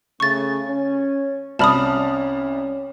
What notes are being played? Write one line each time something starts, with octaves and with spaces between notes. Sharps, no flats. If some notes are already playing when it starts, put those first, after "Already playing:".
C#3 A3 C#6 A6
C#4
C2 C#4 D5 A5 B5 D#6 F6